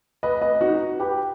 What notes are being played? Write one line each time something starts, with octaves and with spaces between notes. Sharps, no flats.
B4 D#5
B4 D#5
D#4 F#4
G4 B4